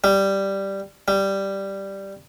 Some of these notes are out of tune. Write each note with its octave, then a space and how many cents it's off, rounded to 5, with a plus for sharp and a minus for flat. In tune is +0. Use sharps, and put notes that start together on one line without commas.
G3 +0
G3 +0